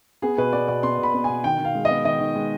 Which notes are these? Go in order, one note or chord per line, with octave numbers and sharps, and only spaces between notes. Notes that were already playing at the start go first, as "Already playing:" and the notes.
B3 G#4
B2 B4
B3 D5
B2 D5
B3 C6
B2 B5
B3
B2 G#5
D#3 G5
D#3
F5
G#3
D#5
B3
D#3 D#5
D#3
G#3